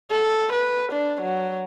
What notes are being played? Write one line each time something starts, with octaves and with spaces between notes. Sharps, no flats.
A4
B4
D4
F#3